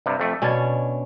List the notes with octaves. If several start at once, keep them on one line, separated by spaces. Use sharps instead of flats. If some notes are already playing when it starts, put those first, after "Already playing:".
G2 C3
F2 A3
B2 C#4 D4 G#5 A5